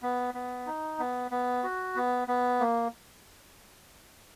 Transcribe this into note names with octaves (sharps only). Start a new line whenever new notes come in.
B3
B3
D#4
B3
B3
F#4
B3
B3
A#3